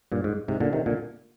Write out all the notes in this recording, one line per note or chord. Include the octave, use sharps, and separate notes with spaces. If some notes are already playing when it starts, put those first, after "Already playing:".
G2 A#2
G#2
G#2 C3
A#2 D3
C3 D#3
A#2 D3